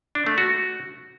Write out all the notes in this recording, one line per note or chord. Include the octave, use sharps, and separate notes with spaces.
D4
A3
F#4